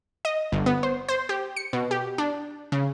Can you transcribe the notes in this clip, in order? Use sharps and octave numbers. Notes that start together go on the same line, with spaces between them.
D#5
G1
B3
C5
C5
G4
C#7
B2
G4
D4
C#3